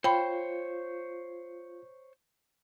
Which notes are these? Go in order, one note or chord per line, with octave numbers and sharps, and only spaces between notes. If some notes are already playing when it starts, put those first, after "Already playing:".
F4 C5 C#5 G5 B5